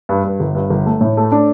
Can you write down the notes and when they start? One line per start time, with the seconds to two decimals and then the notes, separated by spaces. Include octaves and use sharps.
0.09 G2
0.24 G2
0.40 G1
0.55 G2
0.70 G1
0.86 A3
1.01 A2
1.17 A3
1.32 D4